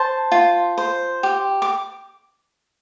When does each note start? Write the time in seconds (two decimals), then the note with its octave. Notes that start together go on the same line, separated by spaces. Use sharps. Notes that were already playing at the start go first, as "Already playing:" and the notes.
Already playing: C5 A5
0.32 F4
0.78 C5
1.23 G4
1.62 D6